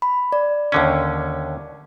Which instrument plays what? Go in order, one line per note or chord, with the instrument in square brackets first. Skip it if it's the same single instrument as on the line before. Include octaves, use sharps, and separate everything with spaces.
[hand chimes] B5
D5
[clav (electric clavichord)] D#2 D3 C#4